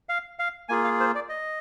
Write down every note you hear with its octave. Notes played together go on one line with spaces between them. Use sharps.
F5
F5
A#3 F4 G#4 G#5
F5
C5
D5
D#5